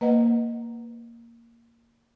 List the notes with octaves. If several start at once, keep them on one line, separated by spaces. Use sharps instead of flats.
A#3 B4 C5 D#5 F#5